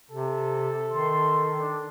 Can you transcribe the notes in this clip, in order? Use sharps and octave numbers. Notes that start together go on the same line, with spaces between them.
C3 A4
D#3 C6
D4